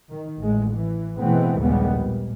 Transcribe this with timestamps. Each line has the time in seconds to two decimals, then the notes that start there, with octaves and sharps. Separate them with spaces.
0.10 D#3
0.40 A1 G#3
0.71 E3
1.19 B2 E3 G#3 A3 B3 C4
1.60 A#1 D#2 C#3 G3 G#3 B3
1.97 A#2